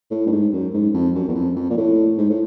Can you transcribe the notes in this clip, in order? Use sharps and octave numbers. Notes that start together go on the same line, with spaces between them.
A2
G2
G#2
F#2
G#2
F2
F#2
E2
F2
F2
A#2
A2
G#2
A2